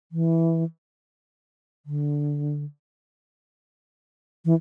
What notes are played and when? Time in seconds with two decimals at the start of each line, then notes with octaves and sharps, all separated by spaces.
0.12 E3
1.86 D3
4.45 E3